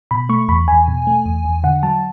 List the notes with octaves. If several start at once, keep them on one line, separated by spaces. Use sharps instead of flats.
B2 B5
A3 C#6
E2 B5
E2 G#5
B2
A3
E2
E2
D3 F#5
F#3 A5